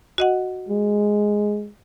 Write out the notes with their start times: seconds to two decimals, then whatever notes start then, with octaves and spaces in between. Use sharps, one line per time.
0.18 F#4 D#5 F#5
0.68 G#3